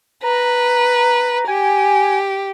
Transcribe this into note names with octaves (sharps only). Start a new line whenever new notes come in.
B4 A#5
G4 G#5